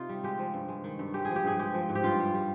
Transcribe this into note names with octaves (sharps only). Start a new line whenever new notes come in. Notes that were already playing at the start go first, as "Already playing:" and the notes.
Already playing: C3 D#4 F4
G3
G#3 G4
F3
G2
G#3
D#3
G2
G#3 G4
F3 G#4
G4
G2 G#4
G#3 G4
F3
G#2
G4
G2 F4
G3
G3